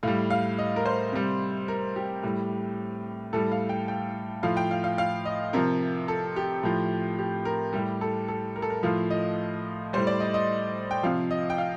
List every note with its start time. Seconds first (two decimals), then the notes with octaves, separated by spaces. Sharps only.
0.03 A2 G3 F5
0.30 F5
0.59 D#5
0.76 A#4
0.86 C5
1.13 C3 G3
1.68 A#4
1.96 G4
2.23 A2 G3
3.33 A2 G3 A4
3.52 F5
3.69 G5
3.88 G5
4.43 A2 F3 F5
4.57 G5
4.71 F5
4.84 F5
4.98 F5
5.25 D#5
5.53 C3 F3 A#4
6.08 A4
6.36 G4
6.63 A2 F3
7.18 G4
7.45 A#4
7.73 A2 G3 G4
8.01 A4
8.28 A4
8.56 A#4
8.62 A4
8.70 A#4
8.83 A2 F3 F5
9.10 D#5
9.93 A2 G3 C5
10.07 D5
10.20 D#5
10.34 D#5
10.91 G5
11.03 C3 F3 F5
11.31 D#5
11.50 G5
11.58 F5